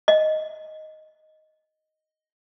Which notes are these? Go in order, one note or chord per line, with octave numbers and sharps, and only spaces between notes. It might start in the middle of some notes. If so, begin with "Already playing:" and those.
D#5